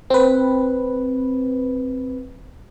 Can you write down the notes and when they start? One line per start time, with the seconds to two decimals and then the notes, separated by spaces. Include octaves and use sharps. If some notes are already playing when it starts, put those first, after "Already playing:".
0.10 C4 B4